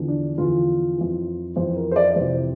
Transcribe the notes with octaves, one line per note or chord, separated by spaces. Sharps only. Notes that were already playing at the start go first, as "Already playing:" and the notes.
Already playing: E2 D3 F3
D4
E2 D3 F3 F4
F2 E3
F2 E3 C5
A#4
C5
D5
D5
F2 C3 E3 C5